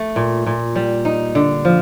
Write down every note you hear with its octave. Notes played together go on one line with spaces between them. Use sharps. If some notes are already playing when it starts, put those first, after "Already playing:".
Already playing: A3
A#2
A#2
G3
D#4
D3
F3